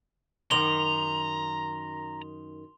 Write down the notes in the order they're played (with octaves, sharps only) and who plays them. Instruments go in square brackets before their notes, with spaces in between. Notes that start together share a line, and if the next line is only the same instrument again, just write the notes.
[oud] F#2 D#3 [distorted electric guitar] A#5 [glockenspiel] C6 F7 G7